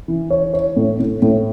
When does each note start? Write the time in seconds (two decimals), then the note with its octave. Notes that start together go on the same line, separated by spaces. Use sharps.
0.08 E3
0.30 C#5
0.54 C#5
0.76 A2
1.00 A2
1.22 A2